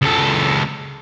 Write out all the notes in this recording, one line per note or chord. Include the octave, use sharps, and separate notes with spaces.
C#2 A4